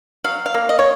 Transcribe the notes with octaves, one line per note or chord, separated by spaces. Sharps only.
F#3 F5
F5
A#3
D#5
C#5